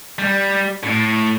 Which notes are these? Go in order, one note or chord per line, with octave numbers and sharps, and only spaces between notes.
G3
A2